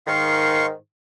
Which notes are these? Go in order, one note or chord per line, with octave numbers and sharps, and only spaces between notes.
G#2 D#3 F5 C6 C#6